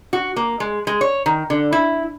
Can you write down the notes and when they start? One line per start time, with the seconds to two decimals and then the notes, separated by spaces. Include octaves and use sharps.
0.13 F#4
0.36 A#3
0.60 G#3
0.87 G#3
1.01 C#5
1.26 D#3
1.50 D3
1.73 E4